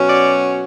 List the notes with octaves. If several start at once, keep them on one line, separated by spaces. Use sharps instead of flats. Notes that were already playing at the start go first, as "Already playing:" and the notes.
Already playing: B2 F#3 C#4
D5